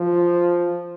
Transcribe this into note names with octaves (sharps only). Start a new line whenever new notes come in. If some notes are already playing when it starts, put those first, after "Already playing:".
Already playing: F3